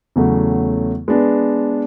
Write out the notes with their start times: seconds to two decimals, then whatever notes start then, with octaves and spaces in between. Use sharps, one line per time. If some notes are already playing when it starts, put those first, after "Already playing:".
0.16 E2 C#3 F#3 A3
1.08 G#3 B3 D4